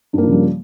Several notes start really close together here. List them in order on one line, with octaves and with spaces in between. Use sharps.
G2 A#3 F3 C#3 G3